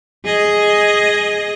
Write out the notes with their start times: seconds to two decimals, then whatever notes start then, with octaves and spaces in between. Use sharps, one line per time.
0.25 G#4 D#5